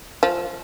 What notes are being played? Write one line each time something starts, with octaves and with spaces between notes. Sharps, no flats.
F3